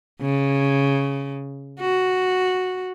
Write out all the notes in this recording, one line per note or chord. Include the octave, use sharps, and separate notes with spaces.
C#3
F#4